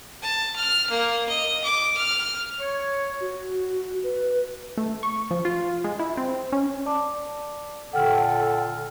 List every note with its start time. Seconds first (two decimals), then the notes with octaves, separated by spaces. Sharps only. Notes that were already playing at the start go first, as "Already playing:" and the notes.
0.22 A5
0.56 F6
0.90 A#3
1.29 D#5
1.64 D6
1.97 F6
2.58 C#5
3.21 F#4
4.03 B4
4.78 A3
5.03 C#6
5.31 F3
5.45 F4
5.84 G#3
5.99 E4
6.17 C4
6.52 C#4
6.86 D5 A5 D6
7.93 A#2 D3 A4 F#5 G5 F6